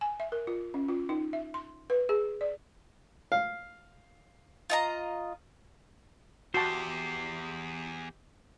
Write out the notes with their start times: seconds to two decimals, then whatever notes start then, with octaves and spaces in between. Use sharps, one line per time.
0.01 G#5
0.20 E5
0.32 A#4
0.47 F4
0.74 C#4
0.88 F4
1.09 D#4
1.33 E5
1.54 C6
1.90 B4
2.09 G#4
2.41 D5
3.32 F5
4.70 F4 D#5 A#5
6.54 E2 F#4 G4 C5 A5